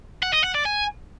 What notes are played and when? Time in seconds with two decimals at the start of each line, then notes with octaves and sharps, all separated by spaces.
0.23 F#5
0.33 D#5
0.44 F#5
0.55 D5
0.65 G#5